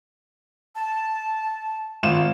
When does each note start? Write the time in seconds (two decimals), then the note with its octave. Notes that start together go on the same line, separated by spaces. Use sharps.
0.75 A5
2.03 G#1 F4 E7